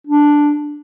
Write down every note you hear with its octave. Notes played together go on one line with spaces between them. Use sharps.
D4